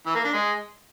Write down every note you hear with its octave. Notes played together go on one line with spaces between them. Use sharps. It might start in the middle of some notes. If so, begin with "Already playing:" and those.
E3
A#3
D4
G#3